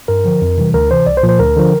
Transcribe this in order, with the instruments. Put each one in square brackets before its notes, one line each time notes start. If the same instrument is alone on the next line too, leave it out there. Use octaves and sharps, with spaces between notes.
[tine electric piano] G2 A#4
D3 F3
F2
C3 E3 G3
D2 A#4
C3 E3 C5
C2 D5
C5
A#2 F3
C5
D2 A#4
D3 F3